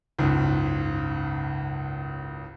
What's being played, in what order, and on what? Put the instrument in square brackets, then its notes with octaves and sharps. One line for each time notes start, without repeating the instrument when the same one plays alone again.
[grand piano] F#1 C#2 G#2